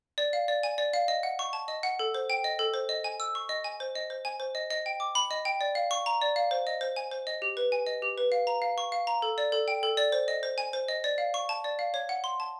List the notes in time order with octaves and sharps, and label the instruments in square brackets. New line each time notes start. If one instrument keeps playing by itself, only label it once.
[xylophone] D5
F5
D5
G#5
D5
F5
D#5
F#5
C#6
A5
D#5
F#5
A4
C5
G5
D#5
A4
C5
D#5
G#5
E6
C#6
D#5
G#5
C5
D#5
C5
G#5
C5
D#5
D#5
G5
D6
B5
D#5
G5
D5
F5
C#6
A#5
D5
F5
C5
D#5
C5
G#5
C5
D#5
G4
B4
G#5
D#5
G4
B4
F5
A#5
F5
C#6
F5
A#5
A4
D5
A4
G5
A4
D5
C5
D#5
C5
G#5
C5
D#5
D5
F5
C#6
A5
D5
F5
C#5
F#5
C6
A5